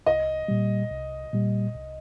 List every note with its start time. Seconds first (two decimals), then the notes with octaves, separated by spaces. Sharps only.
0.06 C2 D#5
0.48 A#2 G3
0.91 C2
1.33 A#2 G3
1.75 C2